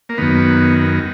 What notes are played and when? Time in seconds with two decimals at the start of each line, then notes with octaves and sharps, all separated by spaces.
0.09 A#3
0.18 F#2 D#3 B3